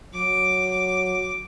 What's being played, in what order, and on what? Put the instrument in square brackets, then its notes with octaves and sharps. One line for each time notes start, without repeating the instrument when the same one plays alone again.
[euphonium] F#3 [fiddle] D6